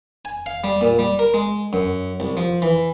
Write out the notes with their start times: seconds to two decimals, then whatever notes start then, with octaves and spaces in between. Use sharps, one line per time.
0.25 G#5
0.46 F5
0.64 G3
0.81 A#2
0.99 G3
1.19 A#4
1.34 G#3
1.73 F#2
2.20 C2
2.37 F3
2.62 E3